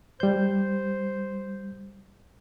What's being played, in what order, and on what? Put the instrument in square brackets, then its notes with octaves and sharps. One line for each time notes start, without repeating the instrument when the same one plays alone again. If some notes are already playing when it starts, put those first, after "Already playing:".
[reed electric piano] G3 G6 [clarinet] C5